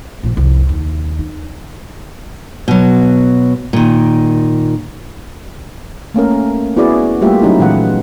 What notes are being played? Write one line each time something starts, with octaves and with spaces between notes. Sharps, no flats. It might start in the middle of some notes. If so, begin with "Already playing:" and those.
A#1 F2
C2 F2
D#2
D#4
B2 F#3
A#2 D#3
A3 A#3 C#4 A#4
B3 E4 F#4 G#4 D5
G3 A3 A#3 F4 G4 E5
F#3 C#4 D#4 E4
A#2 E3 G#3 F#5